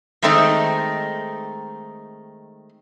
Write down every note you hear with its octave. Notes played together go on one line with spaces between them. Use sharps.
D#3 G#3 A3 C4 D#4